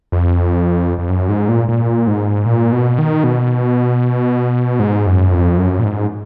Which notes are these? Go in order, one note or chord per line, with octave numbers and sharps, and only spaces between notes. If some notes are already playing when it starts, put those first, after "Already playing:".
F2
F2
F#2
G#2
A#2
A#2
G#2
A#2
B2
D#3
B2
G#2
F#2
F2
F#2
A#2
G#2